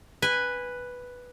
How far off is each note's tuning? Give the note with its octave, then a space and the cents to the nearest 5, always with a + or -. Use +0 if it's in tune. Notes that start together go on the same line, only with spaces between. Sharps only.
B4 +0 G#5 -20